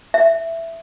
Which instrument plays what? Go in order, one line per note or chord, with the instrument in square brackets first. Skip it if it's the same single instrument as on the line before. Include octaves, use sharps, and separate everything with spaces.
[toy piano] E5